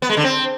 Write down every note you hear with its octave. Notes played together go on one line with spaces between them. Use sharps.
B3
G#3
D3
C4